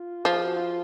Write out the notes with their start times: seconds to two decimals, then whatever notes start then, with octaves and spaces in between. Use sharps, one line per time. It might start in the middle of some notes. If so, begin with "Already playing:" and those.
Already playing: F4
0.25 F3 G#4
0.45 F#4
0.56 F4